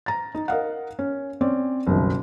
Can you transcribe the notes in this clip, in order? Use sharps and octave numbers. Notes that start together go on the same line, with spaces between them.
A#5 A6
D#4
A#4 D#5 F5 F#5
C#4
C4 C#4 C#5 D5
F#1 C2 B2 D#3